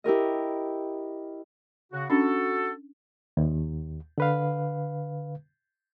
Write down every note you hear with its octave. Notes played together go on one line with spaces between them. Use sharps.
E4 G4 A#4 D#5
C#3 F#4
C#4 D4 F#4 A4
D#2
D3 B4 F5